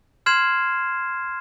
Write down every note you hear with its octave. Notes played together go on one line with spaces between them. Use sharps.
C6 F6 G#6 C7 E7